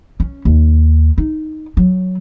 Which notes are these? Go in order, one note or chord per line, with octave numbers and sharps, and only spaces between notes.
C#4
D#2
D#4
F#3